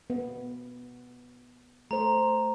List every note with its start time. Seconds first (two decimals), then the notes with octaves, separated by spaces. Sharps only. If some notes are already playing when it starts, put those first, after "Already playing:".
0.10 B3
1.91 A3 C5 A#5